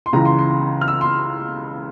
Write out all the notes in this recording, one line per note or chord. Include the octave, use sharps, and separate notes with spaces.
C6
C#2 C#3 E3 A#5
C6
C6
C6
F6
E6
C6